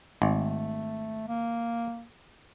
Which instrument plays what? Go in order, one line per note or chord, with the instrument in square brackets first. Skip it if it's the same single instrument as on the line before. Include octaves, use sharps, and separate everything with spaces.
[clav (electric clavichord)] G#1 [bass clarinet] A3
[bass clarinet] A#3